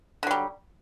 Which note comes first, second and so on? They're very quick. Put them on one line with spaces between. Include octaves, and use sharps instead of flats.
D3 F#3 G3